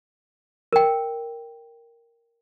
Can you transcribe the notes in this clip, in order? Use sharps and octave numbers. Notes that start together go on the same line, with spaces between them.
A#4 G5